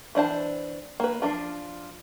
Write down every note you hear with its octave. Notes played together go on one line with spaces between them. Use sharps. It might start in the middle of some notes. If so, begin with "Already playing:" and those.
E3 D4 C5 A5
A#3 B4
F3 D4 F4